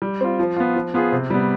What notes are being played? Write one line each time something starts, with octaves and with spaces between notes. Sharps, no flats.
G3
C4 F4
F3
B3 F4
F3
B3 F4 G#4
C3
G3 B3